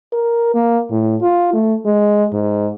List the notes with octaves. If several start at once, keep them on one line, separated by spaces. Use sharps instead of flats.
A#4
A#3
A2
F4
A3
G#3
G#2